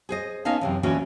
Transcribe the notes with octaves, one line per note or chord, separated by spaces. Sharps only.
G#4 C5 D#5
B3 C#4 D#4 D#5 F5 A5
F#2 C3 E3
D2 A#2 E3 C#4 F#4 G#4